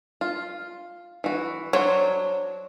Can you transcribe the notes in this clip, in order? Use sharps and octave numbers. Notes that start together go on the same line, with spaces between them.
F4
E3 F#4
F#3 D4 C5 C#5